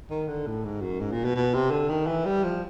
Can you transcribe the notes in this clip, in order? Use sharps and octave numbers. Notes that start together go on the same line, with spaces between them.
D#3
D3
A2
G#2
F#2
G#2
A#2
B2
B2
C3
D3
D#3
E3
G3
F3